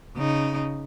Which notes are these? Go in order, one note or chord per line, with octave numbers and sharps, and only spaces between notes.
C#3 D#4